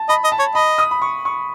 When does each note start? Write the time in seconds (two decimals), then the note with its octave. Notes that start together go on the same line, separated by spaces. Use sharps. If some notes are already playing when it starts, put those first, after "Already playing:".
Already playing: A5
0.09 D#5 B5
0.24 D#5
0.32 A5
0.39 C#5
0.55 D#5 B5
0.78 D#6
0.91 B5
1.02 C#6
1.25 C#6